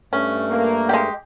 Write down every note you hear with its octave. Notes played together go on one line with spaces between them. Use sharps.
G2 A3 C#4
A#3
G#3 G4